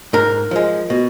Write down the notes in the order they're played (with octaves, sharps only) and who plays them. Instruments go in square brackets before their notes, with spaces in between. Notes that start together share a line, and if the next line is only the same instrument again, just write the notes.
[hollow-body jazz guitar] G#2 A#4
F3 G#3
B2